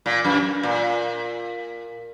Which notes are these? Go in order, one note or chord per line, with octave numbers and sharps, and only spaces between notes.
A#2
F#2
A#2